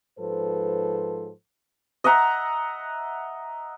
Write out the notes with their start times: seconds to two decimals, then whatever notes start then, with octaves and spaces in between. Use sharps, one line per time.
0.19 G#2 F3 A4 B4 C5
2.04 D#5 E5 F#5 A#5